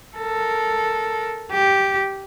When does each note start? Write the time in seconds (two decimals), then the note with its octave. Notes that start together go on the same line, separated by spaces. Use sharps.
0.17 A4 A#4
1.51 G4